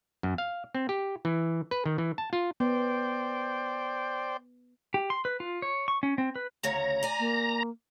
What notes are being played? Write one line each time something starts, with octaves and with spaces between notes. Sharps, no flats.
F#2
F5
C4
G4
E3
B4
D#3
E3
A5
F4
B3 C5 D5 G5
G4
C6
B4
F4
C#5
C#6
C#4
C4
B4
D2 C#3 C#5 A#5
D5 G#5
A#3